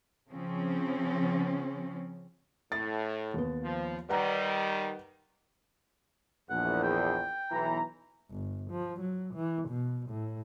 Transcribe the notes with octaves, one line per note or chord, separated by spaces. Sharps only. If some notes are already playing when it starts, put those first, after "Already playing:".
C#3 F3 C4 C#4
A2 A6
D#2 B3
F3
D#3 G3 B4 F#5 A#5
A#1 E2 F#5
G5
B1 E3 A#5
G1
F3
F#3
E3
B2
A2